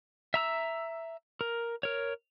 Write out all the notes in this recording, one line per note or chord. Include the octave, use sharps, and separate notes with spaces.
E5 A#5 E6
A#4
A#4 C#5